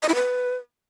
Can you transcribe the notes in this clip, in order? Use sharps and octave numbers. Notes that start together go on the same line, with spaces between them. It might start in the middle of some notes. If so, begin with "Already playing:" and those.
D#5
E4
B4